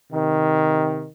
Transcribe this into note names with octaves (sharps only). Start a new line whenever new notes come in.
C3 D#3